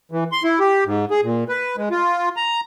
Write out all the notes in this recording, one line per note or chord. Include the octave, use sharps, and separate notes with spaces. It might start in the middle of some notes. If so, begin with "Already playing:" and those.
E3
C6
E4
G4
G#2
G#4
A#2
B4
G#3
F4
A#5